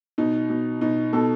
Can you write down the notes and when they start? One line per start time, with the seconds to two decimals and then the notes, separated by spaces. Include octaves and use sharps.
0.18 B2 D#4
0.50 B2
0.81 B2 D#4
1.13 B2 A4